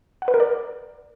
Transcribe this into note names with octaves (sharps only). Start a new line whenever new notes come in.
F#5
B4
A#4
D5